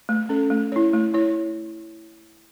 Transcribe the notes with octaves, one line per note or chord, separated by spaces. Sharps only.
A3
C#4 A4
A3
E4 C#5
A3
E4 C#5